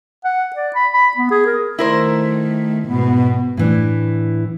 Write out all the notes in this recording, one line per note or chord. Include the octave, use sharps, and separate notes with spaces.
F#5
D5
B5
B5
B3
G#4
A#4
D#3 A3 E4 A#4 C5
G#2 B2 B3
A2 E3 D4